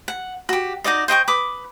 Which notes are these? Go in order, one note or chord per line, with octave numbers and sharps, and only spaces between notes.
F#5
F#4 G4
D#4 F#4 D5 D#5
C5 D#5 G5 C#6
B4 D6 D#6